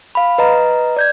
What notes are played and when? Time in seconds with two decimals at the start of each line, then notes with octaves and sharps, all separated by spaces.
0.15 F5 B5
0.38 B4 D#5 A#5
0.97 D5 G6 G#6